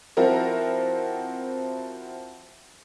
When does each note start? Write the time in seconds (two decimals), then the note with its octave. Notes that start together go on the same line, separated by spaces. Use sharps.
0.17 F3 C4 E4 F#4 A#4